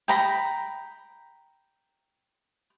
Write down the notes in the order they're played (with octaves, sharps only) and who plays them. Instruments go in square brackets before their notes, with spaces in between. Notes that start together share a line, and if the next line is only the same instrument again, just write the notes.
[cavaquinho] G5 A#5 B5